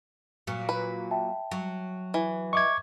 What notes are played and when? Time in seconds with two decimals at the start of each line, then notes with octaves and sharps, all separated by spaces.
0.47 A#2 F#3
0.69 B4
1.11 E5 G5 A5
1.51 F#3
2.14 E3
2.53 D#5 E5 C#6 D6 G#6